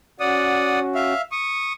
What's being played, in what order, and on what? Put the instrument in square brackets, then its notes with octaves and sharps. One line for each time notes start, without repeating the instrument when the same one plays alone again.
[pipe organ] C#4 F#4 [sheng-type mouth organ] D5 F#5 D#6
[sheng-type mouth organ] E5 F5
C#6 D#6